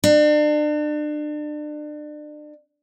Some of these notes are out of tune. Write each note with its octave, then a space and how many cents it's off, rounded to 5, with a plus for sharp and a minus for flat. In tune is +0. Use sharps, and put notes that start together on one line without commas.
D4 +35